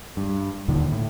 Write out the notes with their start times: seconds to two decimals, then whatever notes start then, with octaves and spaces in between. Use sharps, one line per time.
0.17 G2
0.68 D#2 A#2 D3 D#3
0.92 A2